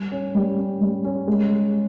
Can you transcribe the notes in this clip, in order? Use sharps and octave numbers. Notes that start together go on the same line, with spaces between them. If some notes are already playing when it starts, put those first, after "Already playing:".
Already playing: G3
C#4
G3
C#4
G3
C#4
G#3
G#3